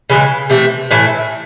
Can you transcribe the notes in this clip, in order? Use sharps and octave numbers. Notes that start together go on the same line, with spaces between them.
C#3 E3 G#3
C3 E3 A3
A2 E3 E5